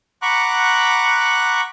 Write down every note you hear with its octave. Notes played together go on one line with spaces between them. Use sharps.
F#5 A#5 B5 C#6 D6 F#6